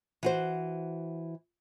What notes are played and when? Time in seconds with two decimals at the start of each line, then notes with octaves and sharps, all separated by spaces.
0.23 E3 F#4 C5